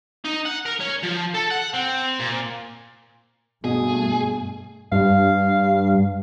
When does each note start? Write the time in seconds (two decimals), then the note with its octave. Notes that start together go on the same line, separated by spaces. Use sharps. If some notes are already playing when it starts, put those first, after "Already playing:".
0.25 D#4
0.45 F#5
0.66 A#4
0.80 C#4
1.03 F3
1.34 A4
1.50 F#5
1.74 C4
2.19 A#2
3.64 G2 B2 A3 G#4
4.92 G2 F5